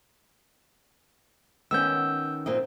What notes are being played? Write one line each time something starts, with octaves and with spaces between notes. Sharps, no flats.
D#3 B3 C#4 E6 G6
A#2 C4 D#5